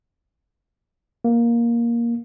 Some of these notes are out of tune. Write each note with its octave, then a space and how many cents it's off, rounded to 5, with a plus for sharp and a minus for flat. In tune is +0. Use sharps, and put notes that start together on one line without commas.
A#3 +10